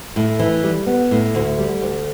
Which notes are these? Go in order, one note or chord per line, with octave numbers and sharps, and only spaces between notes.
A2
E3
G3
B3
A2
D2
G3
D2